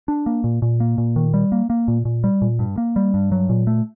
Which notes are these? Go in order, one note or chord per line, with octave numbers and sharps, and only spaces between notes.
D4
A#3
A#2
A#2
A#3
A#2
D#3
G3
A#3
A#3
A#2
A#2
G3
A#2
G2
A#3
G3
G2
F#3
A#2
A3